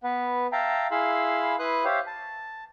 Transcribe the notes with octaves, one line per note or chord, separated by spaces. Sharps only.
B3 B4
E5 F5 G5 A5 A#5
E4 G#4 F5 B5 C6 E6
E4 B4 C6 D#6 F#6
G4 C5 C#5 E5 F5
A5